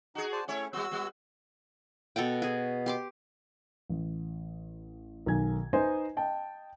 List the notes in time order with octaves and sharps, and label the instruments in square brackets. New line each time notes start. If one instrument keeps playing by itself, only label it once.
[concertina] D#4 [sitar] F#4 G#4
[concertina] C5 D5 A5
[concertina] A3 C#4 [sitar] E4 C#5
[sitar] G3 B3 [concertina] F#4 E6
[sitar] G3 B3
[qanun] B2 A4 F#5 G5
F#4 G#4
G4 C6 D6
[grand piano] A1
B1 D#3 G#5 G#6
D#4 B4 C5 D#5 G#5
D#5 G5 A5